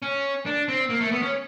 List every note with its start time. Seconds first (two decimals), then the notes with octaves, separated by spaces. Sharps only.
0.02 C#4
0.46 D4
0.68 C4
0.90 A#3
1.01 A3
1.12 B3
1.22 C#4